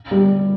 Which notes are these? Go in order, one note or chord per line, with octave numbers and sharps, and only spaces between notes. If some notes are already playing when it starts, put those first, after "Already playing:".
G3